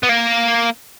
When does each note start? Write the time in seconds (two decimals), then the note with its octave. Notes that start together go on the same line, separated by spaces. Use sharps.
0.03 B3
0.09 A#3